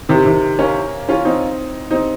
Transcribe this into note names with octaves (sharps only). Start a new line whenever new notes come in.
C3 D#3
C3 D#3
A#3 C#4
C#4 F4
C4 D#4
C4 D#4